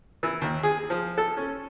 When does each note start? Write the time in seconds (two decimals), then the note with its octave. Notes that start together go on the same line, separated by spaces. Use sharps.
0.23 E3
0.41 D#2
0.63 G#4
0.90 F3
1.18 A4
1.37 C#4